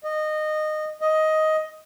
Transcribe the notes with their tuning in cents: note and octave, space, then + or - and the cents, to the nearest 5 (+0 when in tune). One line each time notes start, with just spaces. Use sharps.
D#5 -20
D#5 +10